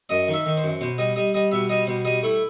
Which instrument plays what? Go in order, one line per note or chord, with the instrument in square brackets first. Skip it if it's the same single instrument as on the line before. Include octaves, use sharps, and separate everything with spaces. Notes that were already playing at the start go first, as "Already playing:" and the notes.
[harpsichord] F#2 D#5
D#3
E5
D#3
C5
F#2
B2 C5
G3 D#5
G3 D#5
G3 D#5
B2 E5
G3 D#5
B2 C5
G3 D#5
A3 E4